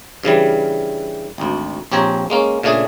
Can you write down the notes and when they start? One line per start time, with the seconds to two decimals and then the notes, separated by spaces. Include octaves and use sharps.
0.23 G2 C#3 E3 G3
1.38 G#1 D2
1.92 A#1 C4 G4 C#5 G#5 A#5
2.30 G#3 A#3 C#4
2.63 A#2 C#3 A3 D4 G#4